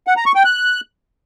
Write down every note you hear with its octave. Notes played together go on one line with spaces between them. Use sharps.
F#5
A#5
C#6
G5
F#6